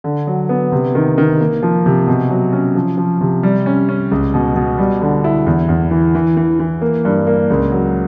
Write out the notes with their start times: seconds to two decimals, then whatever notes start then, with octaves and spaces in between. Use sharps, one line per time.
0.04 D3
0.27 F#3
0.49 B3
0.72 C3
0.95 D#3
1.18 D#3
1.40 A#3
1.63 F3
1.86 C3
2.07 B2
2.31 F#3
2.53 C#4
2.75 F3
2.98 F3
3.21 C3
3.43 G3
3.66 C#4
3.89 C#4
4.11 C#2
4.34 B2
4.56 B2
4.78 G3
5.01 D3
5.24 E4
5.46 E2
5.69 E2
5.91 E3
6.15 E3
6.37 E3
6.60 E3
6.82 A#3
7.05 G2
7.27 A#3
7.50 C#2
7.72 F#3